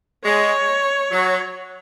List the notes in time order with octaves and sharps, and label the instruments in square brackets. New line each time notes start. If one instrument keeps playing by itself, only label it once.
[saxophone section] G#3 [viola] C#5
[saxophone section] F#3